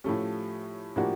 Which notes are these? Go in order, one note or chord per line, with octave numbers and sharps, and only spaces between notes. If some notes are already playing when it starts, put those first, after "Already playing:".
A2 F3 A3 C#4 G4
A2 F3 A#3 D4 F#4 G4